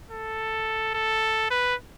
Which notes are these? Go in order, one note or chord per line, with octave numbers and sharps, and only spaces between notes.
A4
A4
B4